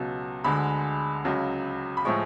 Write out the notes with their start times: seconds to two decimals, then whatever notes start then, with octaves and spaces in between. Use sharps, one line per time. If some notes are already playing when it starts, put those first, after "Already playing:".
Already playing: C#2 B2 F#3
0.44 D2 D3 G#3 B5
1.25 C#2 C#3 F#3
1.97 B5
2.05 A2 F3 G#3 C#6